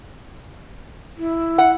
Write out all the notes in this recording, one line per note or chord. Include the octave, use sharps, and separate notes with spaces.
E4
F#5